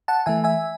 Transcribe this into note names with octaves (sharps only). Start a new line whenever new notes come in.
F#5 A5
E3 A3 E5 G#5
E5 G#5